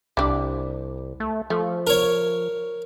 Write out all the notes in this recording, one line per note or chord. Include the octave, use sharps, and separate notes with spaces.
C2 G3 D4 G4
A3
F3 A3
A#4 C#5